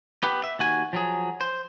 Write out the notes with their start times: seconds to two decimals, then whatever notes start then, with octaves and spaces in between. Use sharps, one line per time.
0.23 B3 G4 B4
0.44 E5
0.59 D#2 F#4 G#5
0.93 F3 F#3 G#4
1.41 C5